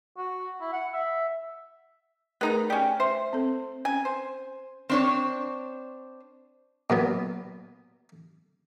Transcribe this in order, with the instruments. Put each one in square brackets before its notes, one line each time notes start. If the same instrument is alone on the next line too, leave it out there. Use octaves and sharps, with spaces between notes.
[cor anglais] F#4
E4
F#5
E5
[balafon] A3 G#4 A#4 [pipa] B3 D#4 A#5
[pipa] C#4 G4 [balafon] D5 G5 G#5
[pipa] C5 [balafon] E5 C6
[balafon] C4 A4
[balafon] C#4 [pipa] G#5
[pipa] C5
[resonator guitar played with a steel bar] C4 D4 C#5
[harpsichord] A#2 F#3 B3